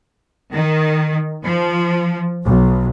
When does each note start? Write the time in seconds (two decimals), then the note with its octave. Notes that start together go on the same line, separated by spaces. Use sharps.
0.52 D#3
1.44 F3
2.45 B1